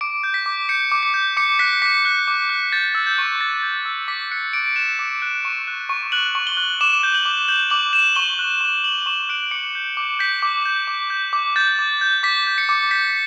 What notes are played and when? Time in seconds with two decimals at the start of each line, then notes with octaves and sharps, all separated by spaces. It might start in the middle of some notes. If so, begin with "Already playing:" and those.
0.01 D6 D7
0.23 G6
0.34 B6
0.46 D6
0.69 G6 C#7
0.92 D6
1.03 C#7
1.14 G6
1.37 D6 C#7
1.59 F#6 B6
1.82 D6 B6
2.05 F#6
2.28 D6
2.50 F#6
2.72 G6 A6
2.95 E6
3.07 G6
3.18 C#6
3.40 C#6 A6
3.63 G6
3.86 E6
4.08 D6 B6
4.31 F#6 C#7
4.53 D6 D7
4.76 F#6 E7
4.99 D6
5.22 F#6
5.45 C#6
5.67 F#6
5.89 C#6
6.12 F#6 F#7
6.35 C#6
6.47 G7
6.57 F#6
6.81 D6 E7
7.03 G6
7.14 F#7
7.25 D6
7.48 G6 F#7
7.70 D6 F#7
7.93 G6 E7
8.15 C#6 G7
8.39 F#6
8.61 C#6
8.84 F#6 F#7
9.01 F#7
9.06 C#6 E7
9.29 F#6 D7
9.51 D6 C#7
9.75 G6
9.97 D6
10.19 G6 B6
10.43 D6
10.66 G6
10.87 D6
11.10 G6
11.33 D6
11.56 G6 A6
11.79 D6
12.01 G6
12.23 D6 B6
12.47 G6
12.58 C#7
12.69 D6
12.91 G6 B6